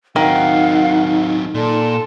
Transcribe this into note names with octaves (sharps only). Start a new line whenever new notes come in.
D#3 F#3 C4 D#4 F5 F#5
A#2 A4 D5 C6